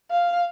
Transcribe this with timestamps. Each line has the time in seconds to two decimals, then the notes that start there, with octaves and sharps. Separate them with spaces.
0.11 F5